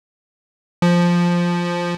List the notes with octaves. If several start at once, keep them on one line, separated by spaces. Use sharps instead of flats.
F3